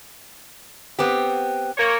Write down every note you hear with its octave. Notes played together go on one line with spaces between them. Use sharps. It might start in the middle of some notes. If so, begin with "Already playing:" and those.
B3 C4 G4
A#3 C#5